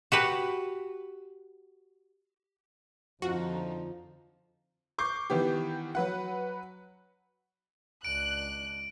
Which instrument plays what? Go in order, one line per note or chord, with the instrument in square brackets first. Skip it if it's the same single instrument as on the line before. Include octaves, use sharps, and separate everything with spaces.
[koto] F#4 G4 B4
[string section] F2 D3 D#4 [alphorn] F3 [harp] F4 [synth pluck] F#4
[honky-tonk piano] C#6 D6 G6 C7
D#3 E3 B3 G4
F#3 B4 F#5
[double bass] C#2 D4 [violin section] F#6 [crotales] D7